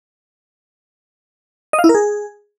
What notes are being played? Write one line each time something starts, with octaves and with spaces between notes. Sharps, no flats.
D#5
F5
E4
A#4
G#4